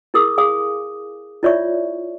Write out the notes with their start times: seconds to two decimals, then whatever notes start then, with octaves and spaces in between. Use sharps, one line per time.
0.14 E4 G#4 A#4 D6 D#6
0.38 G#4 F5 G#5 D6 D#6
1.43 E4 F4 C#5 D5 E5 C#6